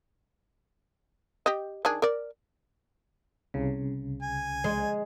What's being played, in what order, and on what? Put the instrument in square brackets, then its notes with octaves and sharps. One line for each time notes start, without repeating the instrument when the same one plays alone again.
[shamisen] G4 D#5
D#3 D4 G#4
A#4 D5
[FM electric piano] C2 C#3
[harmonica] G#5
[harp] G#3